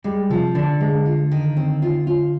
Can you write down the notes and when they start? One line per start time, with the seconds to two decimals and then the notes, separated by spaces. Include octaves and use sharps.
0.04 G3 G#3
0.30 C3 F3
0.55 D3 D4
0.80 G#3
1.06 F4
1.31 D#3
1.57 C4
1.82 F4
2.07 F4